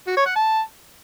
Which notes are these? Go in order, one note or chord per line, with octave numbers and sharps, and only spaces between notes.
F#4
C#5
F#5
A5